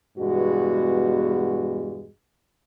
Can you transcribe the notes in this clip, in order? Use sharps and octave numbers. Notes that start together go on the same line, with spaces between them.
E2 G2 B2 G#3 F#4